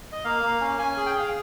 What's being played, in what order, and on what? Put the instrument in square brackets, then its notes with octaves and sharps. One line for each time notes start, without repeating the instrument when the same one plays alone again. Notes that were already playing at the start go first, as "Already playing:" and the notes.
[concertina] D#5
A#3 F5
A#3
C#4
C#4 G#5
G#5
G#4
G5
G#4 F5